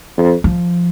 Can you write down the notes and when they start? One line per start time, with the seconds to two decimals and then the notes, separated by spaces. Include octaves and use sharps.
0.17 F2
0.44 F3